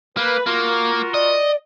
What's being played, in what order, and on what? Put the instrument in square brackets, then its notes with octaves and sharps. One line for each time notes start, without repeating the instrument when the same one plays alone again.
[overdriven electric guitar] A#3 [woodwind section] B4
[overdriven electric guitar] A#3 [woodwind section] F4 F#4 A#4
[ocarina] D5 [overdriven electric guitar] D#5